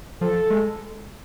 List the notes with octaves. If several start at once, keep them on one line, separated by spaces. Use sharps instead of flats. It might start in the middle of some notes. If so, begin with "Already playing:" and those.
F3 A4
G#3